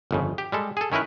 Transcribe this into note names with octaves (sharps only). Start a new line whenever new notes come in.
G1 F2 C#3
G4
G3 G#3 A4
G#4 A4
D#3 C#4 E4 A#4 B4